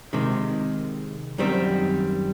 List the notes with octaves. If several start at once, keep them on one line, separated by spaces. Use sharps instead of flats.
C3 D#3 G#3
F#2 D#3 G3 C4